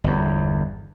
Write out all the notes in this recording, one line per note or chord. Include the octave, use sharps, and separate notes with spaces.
G1 E2